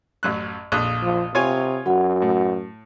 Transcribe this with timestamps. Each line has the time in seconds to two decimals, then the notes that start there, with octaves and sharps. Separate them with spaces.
0.23 A1 F#2 F#6
0.72 A#1 F2 D#6 F#6
1.03 F3
1.35 C3 F4 C#5 G#5
1.86 F#2 F#4 F#5
2.22 A2